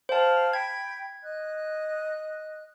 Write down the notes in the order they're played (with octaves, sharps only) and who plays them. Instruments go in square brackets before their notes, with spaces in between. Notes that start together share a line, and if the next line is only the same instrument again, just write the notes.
[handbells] C5 A5 [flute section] F5 G5
[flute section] G5 B5 [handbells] G#6
[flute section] D#5 F#6